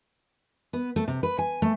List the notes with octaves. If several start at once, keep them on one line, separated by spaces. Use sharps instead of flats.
B3
A3
C3
B4
G#5
A3